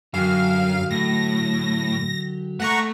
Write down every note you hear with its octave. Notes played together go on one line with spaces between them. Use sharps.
F#2 D3 F#3 G4 F5
A2 A#6
A3 F#5 A#5 C#6